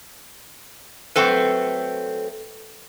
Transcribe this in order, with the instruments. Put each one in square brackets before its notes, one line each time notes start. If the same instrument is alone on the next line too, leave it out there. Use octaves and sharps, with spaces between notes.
[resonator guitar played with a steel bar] F#3 A3 C4 A4 B4